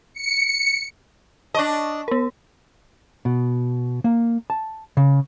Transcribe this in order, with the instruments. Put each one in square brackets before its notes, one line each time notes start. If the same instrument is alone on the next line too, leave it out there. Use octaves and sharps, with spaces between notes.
[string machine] C#7
[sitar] D4 D#5 [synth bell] A5 C#6
[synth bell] B3 A#4
[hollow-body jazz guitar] B2
A#3
A5
C#3